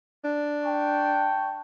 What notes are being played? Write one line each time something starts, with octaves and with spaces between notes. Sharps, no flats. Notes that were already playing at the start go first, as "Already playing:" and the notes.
D4
G5 A5 C#6